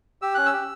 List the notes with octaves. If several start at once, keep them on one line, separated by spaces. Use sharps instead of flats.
G4 E6
C#4 F#6
E6
G4